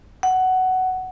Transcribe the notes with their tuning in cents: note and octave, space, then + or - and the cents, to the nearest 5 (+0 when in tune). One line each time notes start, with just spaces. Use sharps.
F#5 +10